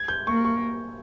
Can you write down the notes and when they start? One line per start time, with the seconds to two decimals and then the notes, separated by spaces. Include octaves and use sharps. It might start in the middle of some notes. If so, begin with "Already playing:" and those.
Already playing: G#6
0.08 G6
0.27 A#3 C#6
0.45 C#6